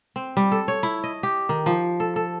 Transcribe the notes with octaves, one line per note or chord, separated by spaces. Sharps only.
C4
G3
A4
C#5
E4
D#5
G4
D#3
F3
A4
A4